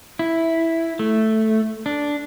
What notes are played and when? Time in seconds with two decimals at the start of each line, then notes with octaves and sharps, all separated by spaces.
0.19 E4
0.99 A3
1.86 D4